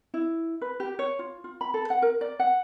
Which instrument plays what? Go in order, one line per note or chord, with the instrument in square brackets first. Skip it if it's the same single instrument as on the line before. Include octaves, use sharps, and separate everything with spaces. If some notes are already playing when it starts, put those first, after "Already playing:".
[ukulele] E4
B4
G4
C#5
F4
F4
B5
A4
F#5
A#4
D5
F#5